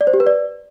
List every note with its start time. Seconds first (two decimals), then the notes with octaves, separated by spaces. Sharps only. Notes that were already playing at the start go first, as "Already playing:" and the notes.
0.01 D5
0.07 C5
0.14 G4
0.20 B4
0.27 D5